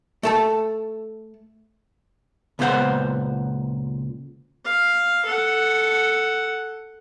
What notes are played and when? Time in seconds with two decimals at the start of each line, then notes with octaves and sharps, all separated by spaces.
0.23 A3 A4 A5
2.59 C#2 A#2 B3 E4 C5 F#5
4.65 F5
5.25 A4 F#5